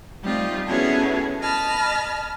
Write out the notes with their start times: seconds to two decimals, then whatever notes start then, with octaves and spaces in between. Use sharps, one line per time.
0.23 G3 A3 C4 D#4 F4 G4
0.65 B3 C#4 E4 F#4 G#4 A4
1.41 D#5 A5 B5 F6